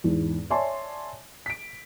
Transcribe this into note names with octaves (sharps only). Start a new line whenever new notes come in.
E2 G#2
C#5 D5 E5 G#5 A5 C6
B6 D7